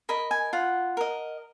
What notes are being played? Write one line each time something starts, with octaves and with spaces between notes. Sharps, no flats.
A#4 D#5 B5
G#5
F4 F#5
A#4 D#5